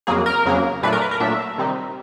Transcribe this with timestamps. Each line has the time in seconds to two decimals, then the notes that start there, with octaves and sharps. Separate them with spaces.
0.07 F2 C#3 F#3 A#3 G#4
0.26 A#4
0.45 F2 C#3 F#3 A#3
0.82 A#2 F#3 A3 D4 B4
0.92 A#4
1.02 B4
1.11 A#4
1.20 A#2 F#3 A3 D4 E5
1.58 C3 D#3 G3 C4 D#4